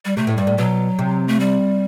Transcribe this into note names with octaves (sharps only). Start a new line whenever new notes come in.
G3
C3 A3
A2
G2 G3
A2
B2 F#3
C3
A3
G3